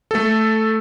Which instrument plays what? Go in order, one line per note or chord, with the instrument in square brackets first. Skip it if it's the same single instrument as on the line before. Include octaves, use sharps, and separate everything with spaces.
[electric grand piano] A3 A4